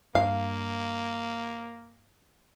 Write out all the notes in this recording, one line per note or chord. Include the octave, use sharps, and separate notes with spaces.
G2 A#3 F5